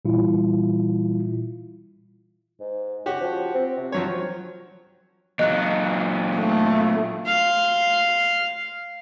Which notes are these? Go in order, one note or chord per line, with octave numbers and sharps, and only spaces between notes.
A#2 E3 G3 E4 F4
G#2
C#3 F#4 G4
F3
C4
C3
F3 F#3 C4 C#5
A#2 F#3 D#5 F#6
A3
F5 C6